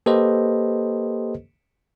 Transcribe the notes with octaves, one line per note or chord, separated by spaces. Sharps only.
A#3 G4 A4 B4 C5 D#5